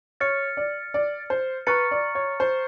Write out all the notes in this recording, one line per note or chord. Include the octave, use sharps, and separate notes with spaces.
C#5 F6 A6 C#7
D5
D5
C5
B4 A#5 C#6 F6 A6 C#7
D5
C#5
C5